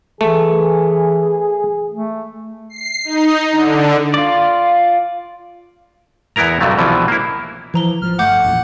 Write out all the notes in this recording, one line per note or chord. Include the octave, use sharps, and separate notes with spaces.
E3 A3 G#4
A3
C7
D#4
D3
F4 D5
E2 B3 E4 A#4 A#5
B1 G2 C3 F#3 A3
C2 B2 E3 F3
A#3 E4
E3 F3 B4 A#5 G7
A1 F3 F6
G1 A3 F#5 D6 G6
A1 F2 A#2